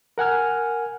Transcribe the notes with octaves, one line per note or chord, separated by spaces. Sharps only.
A#4 F#5 G#5 F6